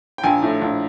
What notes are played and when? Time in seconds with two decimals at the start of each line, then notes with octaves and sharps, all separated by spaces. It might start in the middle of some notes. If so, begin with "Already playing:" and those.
0.18 G5
0.23 A#1 G#5
0.42 A2
0.62 A#1